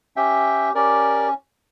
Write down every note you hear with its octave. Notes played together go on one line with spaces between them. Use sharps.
C#4 G4 E5 G5
C#4 G4 A#4 D5